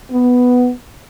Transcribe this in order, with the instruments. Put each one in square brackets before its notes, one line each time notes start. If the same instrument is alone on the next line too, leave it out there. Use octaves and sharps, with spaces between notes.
[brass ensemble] B3